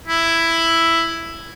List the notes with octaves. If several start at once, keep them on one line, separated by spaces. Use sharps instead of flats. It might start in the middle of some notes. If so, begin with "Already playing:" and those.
E4